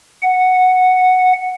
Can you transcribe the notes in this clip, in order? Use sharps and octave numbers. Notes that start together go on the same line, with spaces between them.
F#5